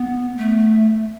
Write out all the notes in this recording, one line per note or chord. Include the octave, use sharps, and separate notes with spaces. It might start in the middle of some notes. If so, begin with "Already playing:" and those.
Already playing: B3
A3